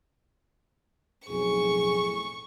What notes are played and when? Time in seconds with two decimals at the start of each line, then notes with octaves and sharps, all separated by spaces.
1.28 B1 F2 A2 G#4 C#6